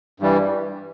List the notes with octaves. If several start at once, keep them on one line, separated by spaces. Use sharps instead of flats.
G2 E3 G3